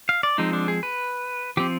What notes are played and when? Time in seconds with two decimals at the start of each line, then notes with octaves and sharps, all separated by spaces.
0.09 F5
0.23 D5
0.38 F3 G#3 C4 D#4
0.53 D4
0.68 G#4
0.83 B4
1.57 F3 C4 G4